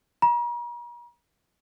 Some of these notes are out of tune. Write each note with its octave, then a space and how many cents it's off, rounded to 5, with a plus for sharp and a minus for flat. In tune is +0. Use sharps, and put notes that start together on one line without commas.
A#5 +40